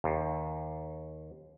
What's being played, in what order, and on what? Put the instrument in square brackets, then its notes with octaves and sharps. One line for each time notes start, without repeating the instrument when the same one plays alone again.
[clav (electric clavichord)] D#2